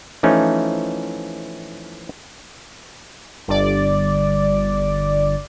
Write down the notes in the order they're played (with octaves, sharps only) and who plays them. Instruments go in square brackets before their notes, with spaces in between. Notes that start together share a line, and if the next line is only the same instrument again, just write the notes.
[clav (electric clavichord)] E3 F3 A3 C#4 D#4
[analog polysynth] G1 D5